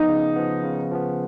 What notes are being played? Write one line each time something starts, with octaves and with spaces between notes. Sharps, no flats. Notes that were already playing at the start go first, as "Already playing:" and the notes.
Already playing: F3 B3 D#4
C#3
F3 B3
C#3
F3 B3